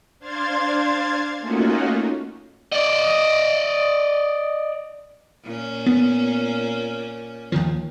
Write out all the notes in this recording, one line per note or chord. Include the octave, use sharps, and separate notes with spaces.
D4 C5 F5 C6 G#6 A6
A3 A#3 C#4 D#4 F4 F#4
D5 D#5
A#2 C#4
B3
D#2 D#3 F3